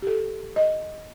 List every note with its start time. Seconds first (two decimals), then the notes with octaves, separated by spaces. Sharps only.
0.02 G4 A4
0.56 D#5